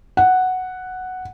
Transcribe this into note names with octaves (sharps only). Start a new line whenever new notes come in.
F#5